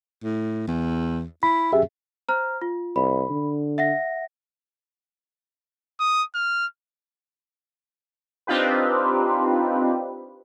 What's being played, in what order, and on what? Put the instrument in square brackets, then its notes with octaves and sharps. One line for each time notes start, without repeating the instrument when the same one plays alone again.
[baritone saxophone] A2
E2
[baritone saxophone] E4 [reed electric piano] B5
[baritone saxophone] F#2 [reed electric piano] G4 G#4 E5
[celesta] C5 A#5 F6
F4
[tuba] C2 [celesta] B5
[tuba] D3
[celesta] E5 F#5 A#6
[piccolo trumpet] D#6
F6
[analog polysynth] C4 D4 D#4 F4 G4 B4